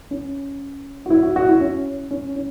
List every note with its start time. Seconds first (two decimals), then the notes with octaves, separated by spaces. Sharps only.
0.11 C#4
1.06 F#4
1.10 E4
1.23 F#4
1.36 F#4
1.49 E4
1.60 C#4
2.11 C#4
2.36 C#4